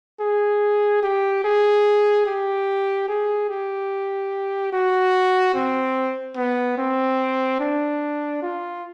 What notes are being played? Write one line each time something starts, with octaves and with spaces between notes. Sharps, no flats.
G#4
G4
G#4
G4
G#4
G4
F#4
C4
B3
C4
D4
F4